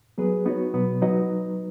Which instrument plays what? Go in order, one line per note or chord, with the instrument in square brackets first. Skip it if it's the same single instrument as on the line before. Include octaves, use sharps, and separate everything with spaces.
[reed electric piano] F#3 B3 G#4 B4
B3 D#4 F#4 C#5
B2 F#3 B3
F#3 D#4 B4 D#5